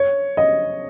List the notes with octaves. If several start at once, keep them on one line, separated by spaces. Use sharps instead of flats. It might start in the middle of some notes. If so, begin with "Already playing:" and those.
Already playing: C#5
D#5